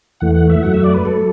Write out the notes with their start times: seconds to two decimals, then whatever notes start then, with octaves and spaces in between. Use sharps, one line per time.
0.20 E2 E3 A3 F#5
0.35 F#5
0.50 E5
0.63 F#2 F#3 A3 F#5
0.74 E5
0.84 D5
0.94 B4
1.05 F#3 A3 A4